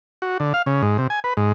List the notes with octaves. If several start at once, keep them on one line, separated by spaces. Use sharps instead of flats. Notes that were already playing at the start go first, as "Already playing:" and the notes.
F#4
D3
F5
C#3
G#2
C3
G#5
B4
G#2